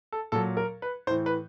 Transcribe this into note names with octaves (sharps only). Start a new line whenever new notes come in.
A4
A#2 F#3 A4
A#4
B4
A2 E3 C5
B4